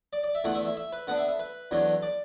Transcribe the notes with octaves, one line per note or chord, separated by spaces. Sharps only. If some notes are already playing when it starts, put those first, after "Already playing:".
D5
D5
E5
E2 D3 A3 F#5
E5
E5
E5
B4
D3 B3 D4 F#5
E5
E5
B4
E2 D3 F#3 A3 D4
D5